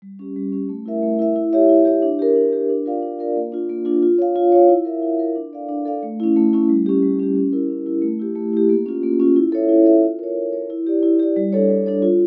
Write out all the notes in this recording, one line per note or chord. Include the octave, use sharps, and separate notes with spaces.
G3
C#4 G4
G3
C#4 G4
A3
E4 A#4 E5
A3
E4 A#4 E5
E4
G4 C#5 E5
E4
G4 C#5 E5
D4
G4 A#4
D4
G4 A#4
D4
F4 A#4 D5 F5
D4
F4 A#4 D5 F5
A#3
D4 F4
A#3
D4 F4
F4
C#5 F5
F4
C#5 F5
E4
A#4 E5
E4
A#4 E5
D4
A4 D5 F5
D4
A4 D5 F5
A3
C#4 E4
A3
C#4 E4
G3
C#4 G4
G3
C#4 G4
C#4
E4 A#4
C#4
E4 A#4
A3
E4 G4
A3
E4 G4
A#3
C#4 F4
A#3
C#4 F4
E4
A4 C#5 E5
E4
A4 C#5 E5
F4
A#4 C#5
F4
A#4 C#5
E4
G4 D5
E4
G4 D5
G3
D4 A4 C#5
G3
D4 A4 C#5
F4